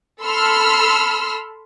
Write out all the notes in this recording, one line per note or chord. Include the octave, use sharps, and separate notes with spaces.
A4 B5 C6 E6 F6